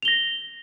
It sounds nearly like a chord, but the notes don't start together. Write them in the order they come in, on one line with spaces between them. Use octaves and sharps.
F7 G7 A#6